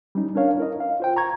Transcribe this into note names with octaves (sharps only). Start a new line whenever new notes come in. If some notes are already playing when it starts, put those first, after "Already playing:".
G3 C#4 D#4
C#4 D4 A#4 C#5 F5
E4 A#4 D#5
F5
F4 C5 G5
A#5 C#6 G#6